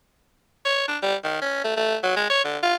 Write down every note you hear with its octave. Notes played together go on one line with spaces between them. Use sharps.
C#5
D4
G3
D#3
C#4
A3
A3
F#3
G#3
C#5
D3
F4